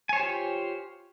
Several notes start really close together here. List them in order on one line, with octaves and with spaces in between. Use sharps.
G#5 C#5 C5 G4 F4